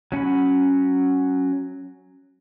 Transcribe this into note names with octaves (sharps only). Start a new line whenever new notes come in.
F#3 C#4 F#5 B5